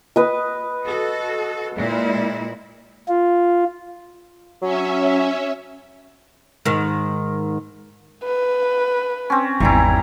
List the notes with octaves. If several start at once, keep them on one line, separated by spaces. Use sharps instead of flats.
B4 D#5
F#4 A4
A#2 G#3 E4
F4
F#3 C#4 E5
G#2 D#3
B4
C4 C#4
G#1 E2 E3 G3 E4 A#5